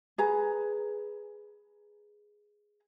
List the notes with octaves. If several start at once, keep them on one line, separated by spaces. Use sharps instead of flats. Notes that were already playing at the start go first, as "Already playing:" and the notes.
G#4 B4 A#5